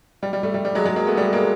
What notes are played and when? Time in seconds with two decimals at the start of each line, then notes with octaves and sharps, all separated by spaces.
0.23 G3
0.33 G3
0.43 G3 A3
0.54 G3
0.65 G3
0.75 F#3 G#3
0.85 F#3 G#3
0.96 G#3 A#3
1.07 A3 B3
1.17 G3 A3
1.33 G#3 A#3